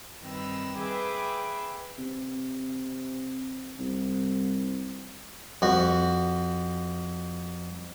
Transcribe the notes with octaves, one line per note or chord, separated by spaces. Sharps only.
G2 D#3 C4 B4 A#5 E6
G#4 B4 E5 G5 B5 D6
C3
C2
F2 F#4